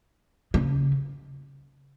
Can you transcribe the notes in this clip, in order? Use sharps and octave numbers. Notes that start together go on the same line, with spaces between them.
C#3